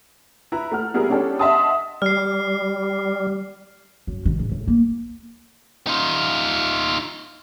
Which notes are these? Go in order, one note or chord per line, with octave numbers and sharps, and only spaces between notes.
E4 B4 A#5
A3 F#5 F6
G3 B3 E4 G#4 A#4
G3 B3 C#4 D4 G4 A4
D#5 E5 F#5 A5 C6 D#6
G3 F6 C7
F#2
D#3
G#2
A2
A#3
D#4 F4